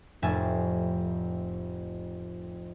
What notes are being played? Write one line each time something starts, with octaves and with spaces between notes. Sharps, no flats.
F1 F2 A2 E5 G#5 A6